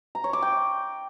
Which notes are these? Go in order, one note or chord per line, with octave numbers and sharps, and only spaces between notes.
A#5
C#5
D6
G5